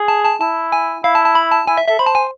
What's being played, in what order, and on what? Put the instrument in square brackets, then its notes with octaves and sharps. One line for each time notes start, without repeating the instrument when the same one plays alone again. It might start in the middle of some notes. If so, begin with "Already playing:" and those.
Already playing: [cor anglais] G#4
[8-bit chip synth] A5
A5
[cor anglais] E4 [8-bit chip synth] A5
[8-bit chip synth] G#5
[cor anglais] E4 [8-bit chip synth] F5
[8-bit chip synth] A5
A5
B5
A5
[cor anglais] E4 [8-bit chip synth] G#5
[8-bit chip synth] E5
[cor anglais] A4 [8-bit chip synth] E5
[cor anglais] C5 [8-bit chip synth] B5
[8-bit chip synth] A5
G#5